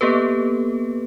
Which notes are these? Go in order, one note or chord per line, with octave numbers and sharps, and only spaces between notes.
A#3 B3 G4 A4 B4